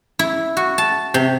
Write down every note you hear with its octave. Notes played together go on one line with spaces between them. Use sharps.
E4
F#4
A5
C3